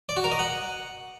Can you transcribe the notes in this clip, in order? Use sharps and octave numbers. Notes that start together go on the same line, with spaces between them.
D5
F#4
A#4
D#5
F#5